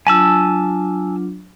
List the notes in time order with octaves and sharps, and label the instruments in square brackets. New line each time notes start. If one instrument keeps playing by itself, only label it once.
[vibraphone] F#3 D4 F4 [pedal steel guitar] G#5 A5 E6